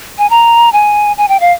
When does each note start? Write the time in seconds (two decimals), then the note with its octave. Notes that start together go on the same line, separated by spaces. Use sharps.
0.18 G#5
0.30 A#5
0.73 G#5
1.17 G#5
1.28 G5
1.40 F5